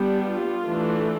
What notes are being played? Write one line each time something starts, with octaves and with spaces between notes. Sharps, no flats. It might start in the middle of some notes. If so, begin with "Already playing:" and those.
Already playing: G3 B3 D4
F4
E3 A3 D4